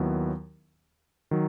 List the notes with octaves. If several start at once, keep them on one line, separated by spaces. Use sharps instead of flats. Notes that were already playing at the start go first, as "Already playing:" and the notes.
Already playing: D#2 D#3 F#3 B3 E4
D#3 F#3